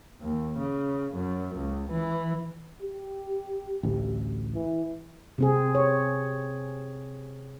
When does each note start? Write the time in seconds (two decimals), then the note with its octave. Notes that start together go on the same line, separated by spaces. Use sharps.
0.21 D#2
0.58 C#3
1.14 F#2
1.56 C#2
1.91 E3
2.82 G4
3.83 A1 D2
4.55 E3
5.38 C3 C4 G#4
5.75 C#5